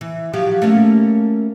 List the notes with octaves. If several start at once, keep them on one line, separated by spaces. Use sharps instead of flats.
E3
F3 F#3 G4
A3 A#3 C#4